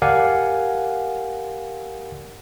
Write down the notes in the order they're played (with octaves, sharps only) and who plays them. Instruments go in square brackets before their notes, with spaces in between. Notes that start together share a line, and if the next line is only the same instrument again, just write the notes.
[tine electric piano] G4 A#4 D5 F5 F#5 G#5